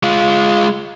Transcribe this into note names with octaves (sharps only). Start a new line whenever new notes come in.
G#3 F4